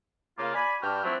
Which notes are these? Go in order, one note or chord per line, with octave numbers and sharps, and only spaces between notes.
C#3 A#3 F4
D5 G#5 B5
G2 D4 F#4 G5 F6
F3 F#3 A3 C4 D4 E4